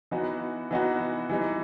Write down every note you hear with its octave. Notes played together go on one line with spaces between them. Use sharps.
E3 B3 D#4 F#4
E3 B3 D#4 F#4
E3 G3 D#4